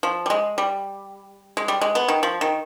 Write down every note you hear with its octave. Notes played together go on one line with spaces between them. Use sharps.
F3
G3
G#3
G3
G#3
G3
G#3
B3
D#3
F3
D#3